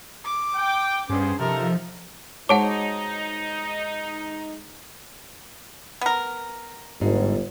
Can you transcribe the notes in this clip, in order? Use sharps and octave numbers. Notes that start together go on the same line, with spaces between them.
D6
G5
G2 B3 C#4 G#4 C5
C3 F3 D#4 A4 A#4
G#3 D#4 F#4 C5 C#5 F#5 A5 D6
B3 A#4
G1 G#2